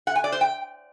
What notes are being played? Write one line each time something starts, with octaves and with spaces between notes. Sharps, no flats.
F#5
G#5
D5
C5
G5